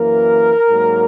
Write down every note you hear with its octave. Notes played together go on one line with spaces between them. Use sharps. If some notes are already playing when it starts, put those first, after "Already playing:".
Already playing: F#2 E3 A#3 A#4
G#2 F#3 A#3